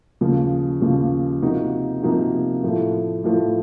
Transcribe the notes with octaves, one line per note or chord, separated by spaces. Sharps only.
D#2 C#3 F3
D#2 C#3 F3
C3 F3 A#3 D#4 F#4
C3 F3 A#3 D#4 F#4
A2 F3 A3
A2 F3 A3